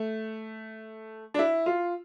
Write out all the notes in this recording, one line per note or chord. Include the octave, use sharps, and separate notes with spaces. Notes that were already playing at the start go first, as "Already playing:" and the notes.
Already playing: A3
D4
E4
F4